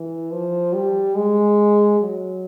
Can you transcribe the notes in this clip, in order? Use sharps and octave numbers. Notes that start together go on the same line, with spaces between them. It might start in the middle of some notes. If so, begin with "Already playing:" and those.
Already playing: E3
F3
G3
G#3
F#3